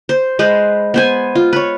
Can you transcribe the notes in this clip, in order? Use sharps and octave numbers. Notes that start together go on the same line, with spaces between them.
C5
G#3 B4 C5
B3 C5 G#5
F4
B4 C#5